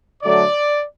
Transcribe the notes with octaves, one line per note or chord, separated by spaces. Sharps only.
D3 F#3 A3 D5